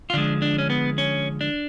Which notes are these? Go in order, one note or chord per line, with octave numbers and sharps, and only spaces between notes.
F4
D3 F3 G#3 D4
D4
C#4
B3
C#4
D4